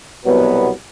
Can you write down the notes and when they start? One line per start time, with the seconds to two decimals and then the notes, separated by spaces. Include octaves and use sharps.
0.25 C2 B2 F#3 B3